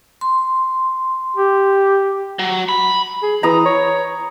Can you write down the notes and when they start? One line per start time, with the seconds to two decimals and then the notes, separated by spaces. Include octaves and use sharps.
0.21 C6
1.37 G4
2.39 F#3
2.69 B5
3.23 G#4
3.43 E3 A#5 D#6
3.66 C#5